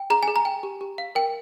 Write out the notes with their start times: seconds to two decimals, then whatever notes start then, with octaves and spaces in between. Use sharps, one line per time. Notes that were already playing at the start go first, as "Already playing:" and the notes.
Already playing: G5
0.10 G#4 A#5
0.23 G#5
0.28 G#4
0.36 A#5
0.45 G5
0.63 G4
0.81 G4
0.98 F5
1.15 A#4 G5